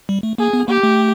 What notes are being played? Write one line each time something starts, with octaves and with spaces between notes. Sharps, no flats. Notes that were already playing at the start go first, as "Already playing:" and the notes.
G3
A3
A#3 G#4
B3
A#3 G4
A3